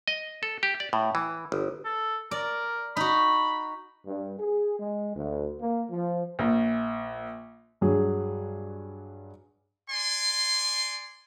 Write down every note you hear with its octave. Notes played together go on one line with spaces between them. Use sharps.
D#5
A4
G4
D5
A2
E3
G1
A4
A#4 D5
D#4 F#4 B5
G2
G#4
G#3
D2
A#3
F3
A#1
G2 F#3 G#4
D5 G#5 C6